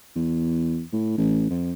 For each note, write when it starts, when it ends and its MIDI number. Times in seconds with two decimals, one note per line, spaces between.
0.16 0.82 40
0.93 1.15 45
1.18 1.47 33
1.50 1.73 41